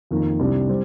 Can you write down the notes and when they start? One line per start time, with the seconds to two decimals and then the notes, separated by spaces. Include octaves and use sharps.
0.11 F2 D#3 A#3 D#4
0.40 C2 C3 G3 D4
0.69 G3 C4